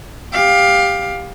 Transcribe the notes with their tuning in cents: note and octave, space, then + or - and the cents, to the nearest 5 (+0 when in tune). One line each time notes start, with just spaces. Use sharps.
G4 +15 F5 +15